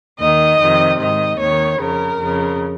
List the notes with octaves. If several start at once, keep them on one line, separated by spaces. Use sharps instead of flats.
D#2 D#3 D#5
F2 C3 D#3
G#2 D#3 D#5
D#2 D#3 C#5
F2 C#3 A#4
F2 C#3